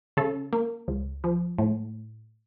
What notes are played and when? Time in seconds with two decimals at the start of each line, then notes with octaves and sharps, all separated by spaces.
0.17 C#3 A4
0.53 A#3
0.88 C#2
1.24 F3
1.58 A2